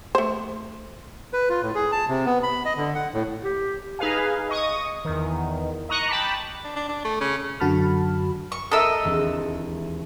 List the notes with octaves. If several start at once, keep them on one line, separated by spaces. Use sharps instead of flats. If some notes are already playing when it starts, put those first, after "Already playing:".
A3 C5
B4
F4
A2
G#4
A5
C3
B3
B5
D#5
D3
F#5
A2
G4
D#4 G#4 B4 F5 G#5
D#5 C#6 D#6
E2 D#3
D#5 A#5 C#6 F#6
G5 A5 B5 D6
D4
D4
D4
A3
C#3
F#2 D3 F#4 A5 B5 F6
C#6
A4 A#4 D#5 E5 E6
E1 D#2 C4